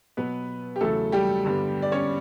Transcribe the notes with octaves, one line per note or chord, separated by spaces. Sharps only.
B2 F#3 B3 B4
G4
E2 C#3 F#3 A3 A4
G3 G4
G2 D3 G3 B3
D5
C#4 C#5